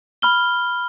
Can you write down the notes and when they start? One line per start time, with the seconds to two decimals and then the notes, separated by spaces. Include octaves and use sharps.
0.22 B5 F6 G7